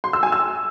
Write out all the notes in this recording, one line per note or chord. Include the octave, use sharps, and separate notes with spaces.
C6
E6
G#5
E6